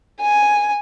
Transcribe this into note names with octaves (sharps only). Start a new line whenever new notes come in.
G#5